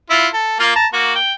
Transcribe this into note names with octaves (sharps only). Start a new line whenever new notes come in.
E4 F4
A4
A#3 F4
A5 A#5
A#3 F#4
G5